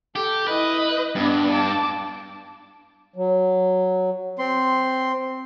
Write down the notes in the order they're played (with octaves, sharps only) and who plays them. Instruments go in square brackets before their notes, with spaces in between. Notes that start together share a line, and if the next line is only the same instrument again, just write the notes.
[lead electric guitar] G4 [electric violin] A4
[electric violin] E4 D#5 [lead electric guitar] B4
[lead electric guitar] G2 [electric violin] B3 D4
[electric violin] A5 D6
[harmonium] F#3
[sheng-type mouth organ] C4 C6